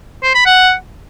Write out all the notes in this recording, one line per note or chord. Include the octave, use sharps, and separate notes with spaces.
C5
B5
F#5